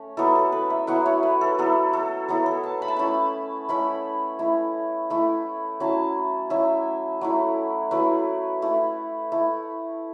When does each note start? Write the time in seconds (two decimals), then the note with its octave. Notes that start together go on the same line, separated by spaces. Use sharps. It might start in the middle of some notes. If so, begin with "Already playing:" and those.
Already playing: A3 C#4
0.17 F#3 B3 E4 A4
0.36 A4
0.52 B4
0.70 E5
0.87 F#3 B3 E4 F#5
1.06 C#5
1.23 B4
1.41 A4
1.58 F#3 B3 E4 A4
1.93 A4
2.28 F#3 B3 E4 A4
2.46 A4
2.64 A5
2.82 B5
2.88 A5
2.97 A3 C#4 E4 B5
3.69 A3 C#4 E4 B5
4.39 A3 E4
5.10 A3 E4
5.80 F#3 C#4 E4 A5
6.50 F#3 C#4 E4 E5
7.21 F#3 A3 E4
7.91 F#3 A3 E4 B4
8.62 A3 E4
9.32 A3 E4